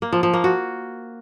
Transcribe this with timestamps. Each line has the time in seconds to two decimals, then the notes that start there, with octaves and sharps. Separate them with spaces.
0.02 A#3
0.13 F3
0.23 F3
0.33 A#3
0.44 F#4